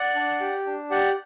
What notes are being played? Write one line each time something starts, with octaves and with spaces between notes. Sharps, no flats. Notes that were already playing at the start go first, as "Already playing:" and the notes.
Already playing: D5 F#5
D4
G4
D4
G4 D5 F#5